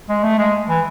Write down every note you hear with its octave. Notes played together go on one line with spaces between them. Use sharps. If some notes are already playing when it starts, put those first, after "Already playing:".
G#3
A3
G#3
E3